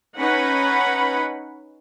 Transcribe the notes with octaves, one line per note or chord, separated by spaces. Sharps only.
C#4 D#4 B4 F#5 B5